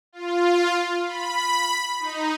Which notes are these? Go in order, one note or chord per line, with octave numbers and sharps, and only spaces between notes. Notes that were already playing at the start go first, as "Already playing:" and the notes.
F4
B5
D#4